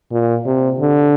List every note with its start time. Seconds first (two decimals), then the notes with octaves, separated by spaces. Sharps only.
0.12 A#2
0.46 C3
0.80 D3